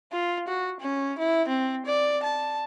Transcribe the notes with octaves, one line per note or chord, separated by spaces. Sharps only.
F4
F#4
C#4
E4
C4
D5
A5